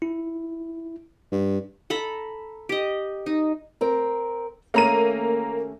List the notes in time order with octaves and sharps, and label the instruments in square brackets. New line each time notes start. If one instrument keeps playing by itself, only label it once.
[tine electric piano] E4
[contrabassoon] G2
[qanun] A4 A#5 B5
G4 D#5
D#4
[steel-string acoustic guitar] C4 A#4
[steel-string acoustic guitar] D#2 A3 C#4 [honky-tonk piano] A#3 A#5 D#7